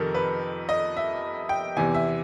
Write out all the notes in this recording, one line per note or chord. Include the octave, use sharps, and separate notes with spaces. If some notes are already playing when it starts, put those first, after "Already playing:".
Already playing: F2 C3 D#3 A4 A#4
B4
D#5
E5
G5
E2 C3 E3 G#5
E5